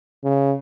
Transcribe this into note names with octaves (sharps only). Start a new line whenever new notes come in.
C#3